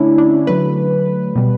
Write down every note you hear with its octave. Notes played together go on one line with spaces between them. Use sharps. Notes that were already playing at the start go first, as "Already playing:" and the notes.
Already playing: D3 A3 C#4 D4 E4
D4
D3 F#3 A3 B4
B2 G3